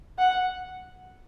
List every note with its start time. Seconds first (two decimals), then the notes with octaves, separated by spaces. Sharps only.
0.18 F#5